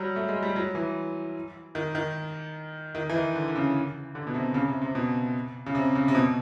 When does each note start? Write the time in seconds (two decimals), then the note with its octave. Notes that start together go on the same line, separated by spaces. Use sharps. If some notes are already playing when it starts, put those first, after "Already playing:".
Already playing: F#3 G3
0.16 A3
0.28 G#3
0.43 G3
0.56 F#3
0.75 E3
1.75 D#3
1.95 D#3
2.95 D#3
3.09 E3
3.16 D#3
3.36 D3
3.48 D3
3.56 C#3
4.15 D3
4.27 B2
4.34 C3
4.54 C#3
4.68 C3
4.82 C3
4.95 B2
5.66 C#3
5.75 C3
5.95 C#3
6.08 C3
6.15 B2